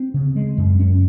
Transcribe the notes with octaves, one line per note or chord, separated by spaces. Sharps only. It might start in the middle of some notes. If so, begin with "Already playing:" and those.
Already playing: C4
C#3
G#3
F#2
C#4